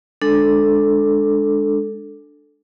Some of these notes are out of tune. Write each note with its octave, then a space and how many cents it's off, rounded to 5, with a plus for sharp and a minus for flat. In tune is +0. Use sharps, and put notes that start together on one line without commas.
G#3 +0 D4 +5 A4 +0